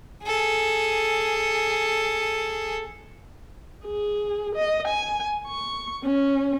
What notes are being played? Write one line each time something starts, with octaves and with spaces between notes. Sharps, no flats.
G#4 A4
G#4
D#5
G#5
C#6
C#4